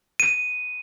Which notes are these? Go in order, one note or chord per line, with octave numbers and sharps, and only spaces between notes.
D#7